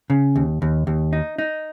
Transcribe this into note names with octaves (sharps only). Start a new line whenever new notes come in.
C#3
D#2
D#2
D#2
D#4
D#4